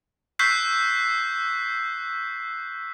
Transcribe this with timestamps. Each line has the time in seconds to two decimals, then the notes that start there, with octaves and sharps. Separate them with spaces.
0.39 C#6 E6 F#6 G6 B6 C7